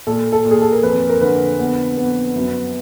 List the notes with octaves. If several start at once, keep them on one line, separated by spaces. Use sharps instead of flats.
A#2 A4
A4
A#2
G#4
A4
A#4
F2 B4
A#4
D3 B4
B3
B3
F#2